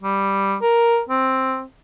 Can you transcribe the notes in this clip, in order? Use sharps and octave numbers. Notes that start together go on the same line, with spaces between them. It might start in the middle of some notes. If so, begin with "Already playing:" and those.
G3
A#4
C4